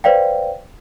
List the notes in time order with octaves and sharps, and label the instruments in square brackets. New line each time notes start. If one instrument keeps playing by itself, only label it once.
[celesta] B4 C5 D5 F5 G5